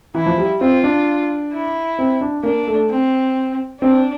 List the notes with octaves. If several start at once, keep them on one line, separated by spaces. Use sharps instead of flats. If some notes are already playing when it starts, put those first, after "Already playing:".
E3 E4
F3
G3
C4 F4
D4
E4
C4
D4
A#3 D4
A3
C4
C4 D4